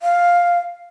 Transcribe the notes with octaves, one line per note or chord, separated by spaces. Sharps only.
F5